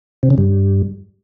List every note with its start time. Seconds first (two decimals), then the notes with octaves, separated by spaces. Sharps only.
0.23 C3
0.30 C#3
0.38 G2